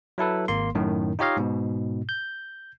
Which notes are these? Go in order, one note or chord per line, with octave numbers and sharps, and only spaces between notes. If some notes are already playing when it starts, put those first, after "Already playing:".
F#3 E4 A4 B4
G#1 A#3 C6
F#2 A2 D#3
D#4 F4 G4 C#5 D#5 F5
G#2 B2
G6